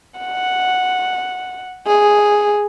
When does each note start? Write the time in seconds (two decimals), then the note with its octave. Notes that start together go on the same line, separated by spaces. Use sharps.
0.19 F#5
1.87 G#4